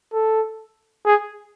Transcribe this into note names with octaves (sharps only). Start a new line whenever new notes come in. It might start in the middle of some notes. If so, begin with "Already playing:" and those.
A4
G#4